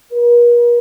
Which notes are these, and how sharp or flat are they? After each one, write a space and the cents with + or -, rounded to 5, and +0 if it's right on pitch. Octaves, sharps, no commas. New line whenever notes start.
A#4 +45